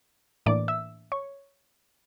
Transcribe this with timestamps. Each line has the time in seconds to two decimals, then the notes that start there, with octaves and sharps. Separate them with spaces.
0.46 A2 E3 A#3 D4 D5 D6
0.68 E5 E6
1.12 C#5 C#6